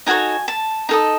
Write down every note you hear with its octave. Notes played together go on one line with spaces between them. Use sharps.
D#4 F#4 A4 C#5 G#5
A5
D#4 A4 D#5